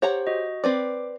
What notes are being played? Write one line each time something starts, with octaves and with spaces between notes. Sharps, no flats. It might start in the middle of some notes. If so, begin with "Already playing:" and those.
G4 C5 C#5 F#5 A#5
F#4 D#5
C4 B4 D5 D6